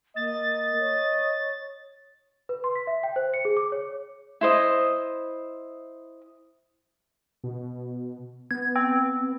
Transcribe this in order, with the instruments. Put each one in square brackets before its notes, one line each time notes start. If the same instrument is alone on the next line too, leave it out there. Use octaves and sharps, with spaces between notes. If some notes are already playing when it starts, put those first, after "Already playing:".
[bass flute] A#3 [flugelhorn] D#5 [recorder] A6
[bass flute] C#5
[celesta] B4
C6
B6
E5
G5
C5
C#7
G#4
D6
C#5
[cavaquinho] E4 C5 D#5
[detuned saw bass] B2
[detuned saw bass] B3 [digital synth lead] G#6
[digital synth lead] C4